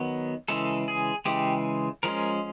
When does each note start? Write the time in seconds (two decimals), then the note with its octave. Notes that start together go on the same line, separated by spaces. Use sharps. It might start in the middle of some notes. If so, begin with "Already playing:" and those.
Already playing: D#3 F#3 B3
0.48 C#3 E3 G#3 A4
0.88 G#4
1.25 C#3 E3 G#3 G4
2.03 F3 G#3 C#4 A#4